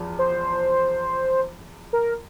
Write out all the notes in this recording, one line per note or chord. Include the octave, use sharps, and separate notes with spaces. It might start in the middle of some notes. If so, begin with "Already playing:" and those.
Already playing: E2 F3
C5
A#4